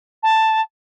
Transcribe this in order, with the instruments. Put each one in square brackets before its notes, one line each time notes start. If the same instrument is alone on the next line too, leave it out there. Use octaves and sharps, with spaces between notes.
[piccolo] A5